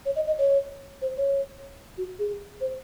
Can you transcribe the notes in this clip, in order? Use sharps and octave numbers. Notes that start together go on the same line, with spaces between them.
C#5
D#5
D#5
C#5
C5
C#5
F#4
G#4
C5